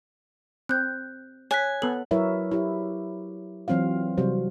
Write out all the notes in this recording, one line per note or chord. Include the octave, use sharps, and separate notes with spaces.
C4 F#6 G6
C#5 G#5 F#6 B6
B3 A4 F#7
F#3 E4 A#4 B4 C#5 E5
E4 G4
E3 F#3 C4 F4 F5
C3 F#3 G3 F#4 C5